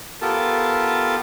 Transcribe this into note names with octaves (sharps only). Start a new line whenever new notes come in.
B3 F4 G4 A4 A#4 A5